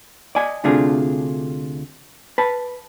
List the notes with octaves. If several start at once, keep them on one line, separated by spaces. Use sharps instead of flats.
D5 D#5 G#5
D2 C3 A3 D4 F4 G#4
B4 A5